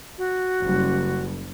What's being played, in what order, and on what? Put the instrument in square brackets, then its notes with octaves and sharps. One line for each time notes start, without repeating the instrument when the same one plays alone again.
[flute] F#4
[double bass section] F#1 C#3 G3